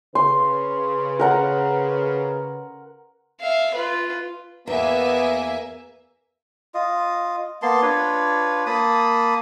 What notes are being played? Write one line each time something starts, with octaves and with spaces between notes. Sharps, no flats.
C#3 B4 C6
A#4 F#5 A#5
E5 F5
F4 B4
E2 A#3 B3 E5 G#5
F4 D#5
A#3 B3 A5 C6
D4 F4 B4 C#5
A#3 A5 B5 D#6